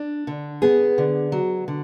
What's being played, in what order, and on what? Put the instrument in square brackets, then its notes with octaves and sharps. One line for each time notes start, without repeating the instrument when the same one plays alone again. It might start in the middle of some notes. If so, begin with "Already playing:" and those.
Already playing: [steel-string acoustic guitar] D4
D3
[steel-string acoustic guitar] B3 [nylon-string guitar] G#4
[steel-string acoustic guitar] D3
F#3
D3